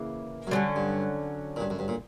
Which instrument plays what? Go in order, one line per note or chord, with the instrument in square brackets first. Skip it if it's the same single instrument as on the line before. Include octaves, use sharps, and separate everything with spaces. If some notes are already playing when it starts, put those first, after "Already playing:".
Already playing: [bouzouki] C#3 E3 A#3
[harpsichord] F#2
[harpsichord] G2 [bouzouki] D3 F#3 C#4
[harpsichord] G2
A#2
G2
F#2
G2
A#2